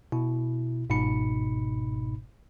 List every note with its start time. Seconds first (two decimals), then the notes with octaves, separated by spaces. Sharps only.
0.12 B2 E4
0.89 G1 G#2 B2 D#4 B5 C#7